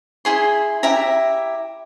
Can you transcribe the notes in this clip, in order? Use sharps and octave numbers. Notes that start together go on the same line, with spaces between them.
E4 G#4 C6
E4 G4 E5 A#5